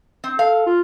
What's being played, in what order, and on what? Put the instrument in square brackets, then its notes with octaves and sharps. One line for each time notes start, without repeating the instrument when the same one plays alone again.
[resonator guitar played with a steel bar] C4
[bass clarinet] A4 [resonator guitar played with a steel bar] F5
[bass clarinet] F4